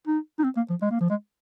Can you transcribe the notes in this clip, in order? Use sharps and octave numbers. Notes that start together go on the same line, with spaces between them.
D#4
D#4
C4
A#3
F3
G#3
A#3
F3
G#3